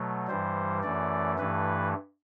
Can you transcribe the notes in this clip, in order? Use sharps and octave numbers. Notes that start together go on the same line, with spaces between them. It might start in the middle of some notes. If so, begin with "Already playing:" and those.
Already playing: B2 F#3 A3
G2 E3 G3 C5
F#2 E3 A3 D5
G2 E3 A3 B4